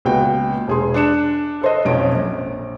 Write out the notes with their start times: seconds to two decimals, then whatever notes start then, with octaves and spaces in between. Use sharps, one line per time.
0.05 C#2 A#2 B3 F#4 G5
0.68 E1 G#4 C6
0.94 D4 F#6 C#7 E7
1.61 A4 C5 D#5
1.85 B1 F2 C#4 D7
2.12 A#1